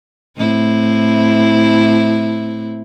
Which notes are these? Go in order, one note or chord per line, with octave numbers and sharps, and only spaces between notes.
A2 C4 E4